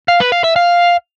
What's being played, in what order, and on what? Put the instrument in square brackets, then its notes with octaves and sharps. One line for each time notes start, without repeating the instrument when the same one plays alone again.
[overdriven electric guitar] F5
B4
F5
E5
F5